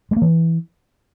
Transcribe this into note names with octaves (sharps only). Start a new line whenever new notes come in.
G#3
A#3
E3